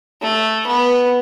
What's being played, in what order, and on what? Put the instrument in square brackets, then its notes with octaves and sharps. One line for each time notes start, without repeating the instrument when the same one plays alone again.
[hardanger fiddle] A3
B3